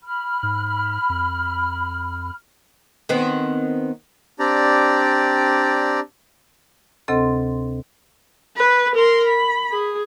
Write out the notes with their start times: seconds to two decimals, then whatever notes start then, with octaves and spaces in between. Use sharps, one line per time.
0.02 B5 F6
0.43 G#2
1.09 F2
3.09 D#3 B3 C4
4.39 C4 D4 G4 D5 A#5
7.08 D2 C3 C4 A4 D#5 C6
8.56 B4
8.95 A#4 C6
9.27 B5
9.72 G#4